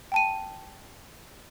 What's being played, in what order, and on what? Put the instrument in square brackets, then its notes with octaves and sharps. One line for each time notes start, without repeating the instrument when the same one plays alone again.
[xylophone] G5 A5 D#7